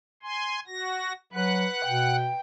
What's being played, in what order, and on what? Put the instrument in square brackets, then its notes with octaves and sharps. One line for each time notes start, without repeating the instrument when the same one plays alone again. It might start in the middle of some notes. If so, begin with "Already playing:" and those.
[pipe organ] G#5 C6
F#4 A#6
[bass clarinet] F#3 [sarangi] B4 [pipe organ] F#5 F#6
[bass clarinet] B2 [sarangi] G5